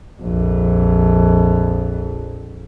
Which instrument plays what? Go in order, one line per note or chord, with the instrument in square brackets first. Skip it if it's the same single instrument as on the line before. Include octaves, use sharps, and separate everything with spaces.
[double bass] A#1 F2